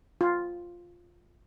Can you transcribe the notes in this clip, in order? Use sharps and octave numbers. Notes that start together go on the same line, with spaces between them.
F4